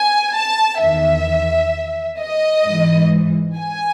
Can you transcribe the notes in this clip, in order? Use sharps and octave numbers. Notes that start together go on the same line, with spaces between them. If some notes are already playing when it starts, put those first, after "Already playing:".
Already playing: G#5
A5
E2 D#3 E5
D#5
G#2 E3
G#5